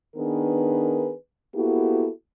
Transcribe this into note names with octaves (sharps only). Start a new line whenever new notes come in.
D#3 B3 D4 G#4 A#4 B4
A#3 B3 E4 F#4 G4 A4